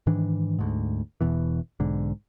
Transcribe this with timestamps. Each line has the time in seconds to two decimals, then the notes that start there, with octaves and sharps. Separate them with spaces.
0.07 G#2 D#3 E3 D4
0.59 D2 G#2
1.21 E1 E2 B2 E3
1.80 B1 G#2 D3